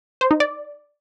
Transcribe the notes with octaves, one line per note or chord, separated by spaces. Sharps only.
C5
D#4
D5